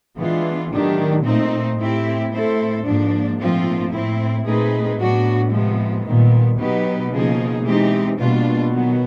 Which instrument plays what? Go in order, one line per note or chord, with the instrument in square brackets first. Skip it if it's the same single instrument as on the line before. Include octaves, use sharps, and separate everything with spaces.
[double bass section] E3 [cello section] G#3 B3 D4 F4
[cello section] A2 F#3 A3 D4 G4 [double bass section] D#3
[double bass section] A#2 [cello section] A3 C4 D#4
[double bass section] A2 [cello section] A3 C4 E4 G4
[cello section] A3 C4 E4 A4 C5
[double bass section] G#2 [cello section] F3 A#3 D4
[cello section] A#2 F3 A3 C4 F4
[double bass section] A2 [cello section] A3 C4 E4
[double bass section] A#2 [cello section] A3 C4 D#4 G#4 B4
[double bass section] A2 [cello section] F#3 B3 D4 F#4
[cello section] C3 F3 G#3 B3
[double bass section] A#2 [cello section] D#3 G3 B3
[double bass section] B2 [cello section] F#3 B3 D#4 G4 B4
[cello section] C#3 F3 A#3 D#4 G#4
E3 G#3 C4 D#4 G4
[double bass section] B2 [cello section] G3 A#3 D4 F4
[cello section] D#3 F#3 B3